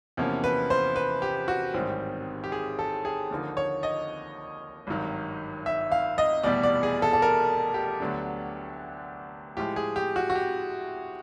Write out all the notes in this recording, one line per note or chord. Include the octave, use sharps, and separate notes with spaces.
E2 C3 F3 A#3 C#4
B4
C5
B4
G4
F#4
A1 G#2 D#3 G3 C4
G4
G#4
A4
G#4
D#2 D3 F3 A#3 D#4
C#5
D#5
G#1 G2 D#3 F#3
E5
F5
D#5
F1 E2 B2 G3 D5
D5
G#4
A4
A4
A#4
G4
D2 D3 F#3 B3 D4
A2 F3 G#3 G4
G#4
G4
F#4
F#4
G4